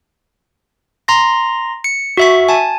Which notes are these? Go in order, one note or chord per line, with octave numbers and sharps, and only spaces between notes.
A#5 C6 A#6
C#7
F#4 E5 C#6
G#5 A5